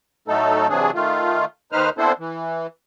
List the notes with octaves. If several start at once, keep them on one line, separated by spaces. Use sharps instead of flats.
A2 F#3 A3 D#4 A4
C3 E3 F#3 D4 G#4
D#3 A3 F4
D#2 D#3 D#4 B4 C5 F6
B3 C4 D4 E4 A4 C5
E3